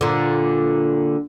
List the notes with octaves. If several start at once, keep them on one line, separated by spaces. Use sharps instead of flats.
A#2 D3